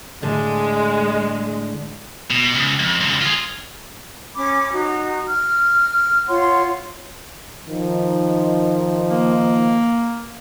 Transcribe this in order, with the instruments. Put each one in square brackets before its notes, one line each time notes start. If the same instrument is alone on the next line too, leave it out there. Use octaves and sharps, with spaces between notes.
[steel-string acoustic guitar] A2 D3 [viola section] G#3
[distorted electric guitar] B2
C#2
F2
C#2 D3
F4 G#4
[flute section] C#4 B5 D6
D#4 F#4
F6
F4 C#5 F#5 C6
[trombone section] D#3 F3 D#4
[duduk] A#3